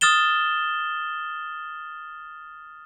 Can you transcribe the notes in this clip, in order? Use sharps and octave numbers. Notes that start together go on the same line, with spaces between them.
D#6 F6 A6 E7 G7